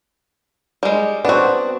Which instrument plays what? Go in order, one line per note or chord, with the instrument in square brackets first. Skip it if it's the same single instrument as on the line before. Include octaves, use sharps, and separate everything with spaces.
[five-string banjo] G3 G#3
[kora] B3 C4 [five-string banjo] D4 F#4